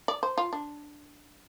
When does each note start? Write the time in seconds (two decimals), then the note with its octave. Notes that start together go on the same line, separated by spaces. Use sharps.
0.08 D5
0.23 C5
0.38 F4
0.53 D4